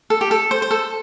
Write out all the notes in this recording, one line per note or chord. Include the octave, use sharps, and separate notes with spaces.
A4
G4
A4
C5
C5
A4